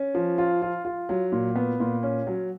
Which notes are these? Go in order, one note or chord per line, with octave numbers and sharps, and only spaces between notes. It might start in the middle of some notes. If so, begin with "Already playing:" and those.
Already playing: C#4
F3
F4
F4
F4
F#3
A#2
B3
A#2
C#4
F#3